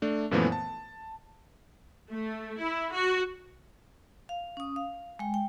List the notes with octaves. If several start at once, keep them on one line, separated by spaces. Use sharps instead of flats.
A3 D4
F#2 A#2 E3 F3 A3 B3
A5
A3
E4
F#4
F5
C#4 D#6
F5
G#3 G5
G5